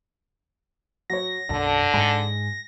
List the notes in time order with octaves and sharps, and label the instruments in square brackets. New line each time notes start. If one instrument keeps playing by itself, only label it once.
[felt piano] F#3 C#5 [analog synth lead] A#6
[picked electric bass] B1 F#2 [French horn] D3 [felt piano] A5
[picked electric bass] G#2 G#3 [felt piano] G#5